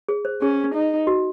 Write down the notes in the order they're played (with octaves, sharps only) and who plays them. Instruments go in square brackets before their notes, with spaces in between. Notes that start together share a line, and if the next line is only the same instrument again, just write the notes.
[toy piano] G#4
C5
[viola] C#4 [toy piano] G#4
[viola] D#4
[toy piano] F#4